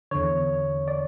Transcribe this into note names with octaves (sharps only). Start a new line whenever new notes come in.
E2 D3 C#5
D5